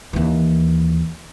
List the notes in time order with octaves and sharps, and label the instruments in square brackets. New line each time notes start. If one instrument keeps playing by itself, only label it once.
[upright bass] D#2 E3